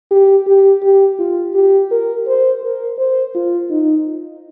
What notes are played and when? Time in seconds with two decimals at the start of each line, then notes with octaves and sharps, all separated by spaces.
0.11 G4
0.47 G4
0.83 G4
1.19 F4
1.55 G4
1.91 A#4
2.27 C5
2.63 A#4
2.98 C5
3.35 F4
3.70 D#4